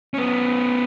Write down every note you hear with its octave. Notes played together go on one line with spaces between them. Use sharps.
B3 C#4